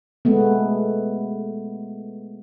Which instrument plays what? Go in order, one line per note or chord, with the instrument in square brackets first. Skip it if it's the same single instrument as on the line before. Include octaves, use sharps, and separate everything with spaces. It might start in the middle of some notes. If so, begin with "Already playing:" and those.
[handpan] G#3 A3 B3